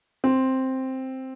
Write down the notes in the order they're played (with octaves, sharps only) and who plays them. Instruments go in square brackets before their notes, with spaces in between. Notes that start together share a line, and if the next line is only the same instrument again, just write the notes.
[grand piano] C4